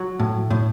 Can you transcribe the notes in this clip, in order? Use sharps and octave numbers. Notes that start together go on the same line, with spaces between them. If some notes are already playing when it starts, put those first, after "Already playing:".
Already playing: F#3
A2
A2